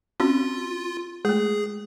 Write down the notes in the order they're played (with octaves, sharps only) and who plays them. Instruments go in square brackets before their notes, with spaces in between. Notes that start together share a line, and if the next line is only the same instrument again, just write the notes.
[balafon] C4 C#4 F#4 [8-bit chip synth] F4
[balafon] G#3 A3 [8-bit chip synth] G#4